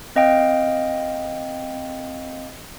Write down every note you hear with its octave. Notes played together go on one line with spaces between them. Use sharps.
C4 D#5 F5 G5